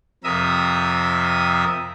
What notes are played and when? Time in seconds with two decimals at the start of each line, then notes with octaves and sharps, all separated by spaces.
0.24 F2 C3 A#4 E5 D#6